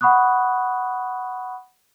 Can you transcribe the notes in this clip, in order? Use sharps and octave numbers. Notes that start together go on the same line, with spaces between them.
F#5 B5 C#6 D#6 F#6